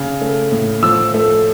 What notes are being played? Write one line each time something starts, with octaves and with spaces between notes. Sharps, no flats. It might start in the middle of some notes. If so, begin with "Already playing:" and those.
Already playing: C#3 F6
A3
A2
F3 E6
A3